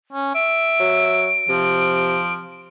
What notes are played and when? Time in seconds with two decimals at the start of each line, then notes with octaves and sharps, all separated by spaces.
0.13 C#4
0.35 E5 D7
0.80 F#3
1.49 C3 F3